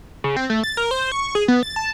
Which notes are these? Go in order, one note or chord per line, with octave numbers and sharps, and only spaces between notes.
C#3
C4
A3
A6
A#4
C5
C#6
G#4
B3
A6
A5